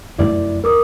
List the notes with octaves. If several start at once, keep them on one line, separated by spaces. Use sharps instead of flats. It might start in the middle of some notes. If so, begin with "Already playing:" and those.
F1 F#2 A3 E4 D5
E2 A#4 D6 D#6